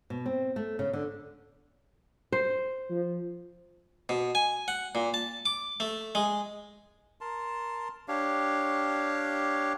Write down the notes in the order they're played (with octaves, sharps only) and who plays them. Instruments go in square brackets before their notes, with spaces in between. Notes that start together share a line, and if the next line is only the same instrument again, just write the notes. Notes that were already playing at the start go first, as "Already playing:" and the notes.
[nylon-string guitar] B2
C4
A3
C#3
D3
[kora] C5
[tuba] F3
[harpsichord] B2
G#5
F#5
A#2
A5
D6
A3
G#3
[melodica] A#4 A5 C6
D4 G4 C#5 F5